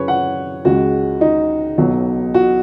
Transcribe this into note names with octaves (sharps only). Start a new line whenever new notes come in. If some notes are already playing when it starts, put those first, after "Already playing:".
Already playing: F#2 C#3 F#3 G#4 B4 C#5
F#5
C#2 C#3 G#3 F#4
D#4
B1 B2 F#3
F#4